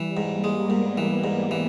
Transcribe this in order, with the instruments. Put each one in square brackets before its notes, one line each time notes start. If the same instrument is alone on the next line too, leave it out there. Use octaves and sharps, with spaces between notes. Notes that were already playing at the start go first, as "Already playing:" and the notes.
Already playing: [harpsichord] E3 [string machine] G3
[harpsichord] G#2
[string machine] A#3
[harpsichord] G#3
[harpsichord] G#2 [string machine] B3
[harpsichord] E3
G#2
E3